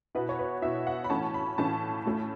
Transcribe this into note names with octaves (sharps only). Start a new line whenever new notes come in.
B2 B3 E4 B4
C#5
B4
B2 B3 E4 E5
F#5
B5
A2 E3 A3 C#4 A5
B5
A2 E3 A3 C#4 A5
A2 A3 C#4